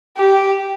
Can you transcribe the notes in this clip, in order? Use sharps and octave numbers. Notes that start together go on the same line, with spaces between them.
G4